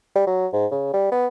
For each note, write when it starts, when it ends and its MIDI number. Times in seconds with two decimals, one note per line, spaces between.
0.16 0.24 55
0.27 0.47 54
0.53 0.66 44
0.72 0.92 49
0.94 1.07 55
1.12 1.27 59